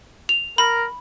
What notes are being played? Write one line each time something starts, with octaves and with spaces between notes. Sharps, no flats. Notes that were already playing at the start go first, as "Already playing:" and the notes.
F7
A#4 B5